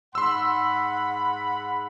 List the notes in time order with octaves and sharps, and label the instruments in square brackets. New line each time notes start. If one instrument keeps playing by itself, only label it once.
[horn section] G#2 F#5 B5 [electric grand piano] C6 E6